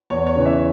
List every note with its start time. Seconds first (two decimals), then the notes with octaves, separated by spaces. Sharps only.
0.10 E2 C#5
0.27 C#5
0.35 C#3 E3
0.45 E5